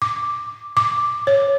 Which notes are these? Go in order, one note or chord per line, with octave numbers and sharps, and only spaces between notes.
D6
D6
C#5